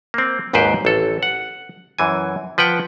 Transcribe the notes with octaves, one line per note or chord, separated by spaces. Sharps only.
A#3 C4
G#1 D#2 G#2 B4 C5 G5
A1 A4
F#5
F#2 E3 G#5
F3 B4 F#5 G5